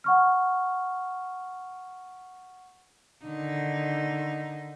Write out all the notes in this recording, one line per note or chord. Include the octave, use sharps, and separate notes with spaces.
F#5 C#6 F6
D3 D#3 D#4